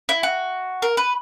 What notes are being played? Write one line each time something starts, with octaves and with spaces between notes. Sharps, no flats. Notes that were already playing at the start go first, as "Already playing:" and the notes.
E4
F#4
A#4
B4